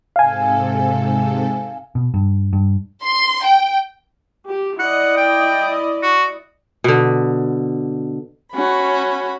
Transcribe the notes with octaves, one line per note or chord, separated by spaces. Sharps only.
G#2 C3 A4 F5 G#5
B2
G2
G2
C6
G5
G4
E4 D5 D#5 F#5
G5
F#4
B2 D3
C#4 F#4 B5